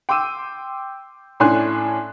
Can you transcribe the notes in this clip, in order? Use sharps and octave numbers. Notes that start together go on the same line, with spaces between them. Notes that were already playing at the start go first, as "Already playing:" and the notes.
G5 C6 D6 E6 D#7
A2 C#4 D4 G#5 C6 F#6